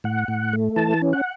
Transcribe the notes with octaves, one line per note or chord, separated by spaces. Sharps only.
A2 F#5
A2
A3
E3 A5
C#4
F#5